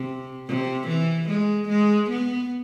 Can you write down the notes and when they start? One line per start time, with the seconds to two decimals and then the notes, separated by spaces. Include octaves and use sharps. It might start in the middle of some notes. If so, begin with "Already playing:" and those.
Already playing: C3
0.47 C3
0.88 E3
1.29 G#3
1.69 G#3
2.10 B3